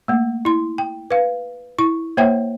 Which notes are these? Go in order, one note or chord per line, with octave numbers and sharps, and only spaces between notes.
A3 A#3
E4 C6
G5
B4 F5
E4 C#6
A#3 C5 C#5 E5 G5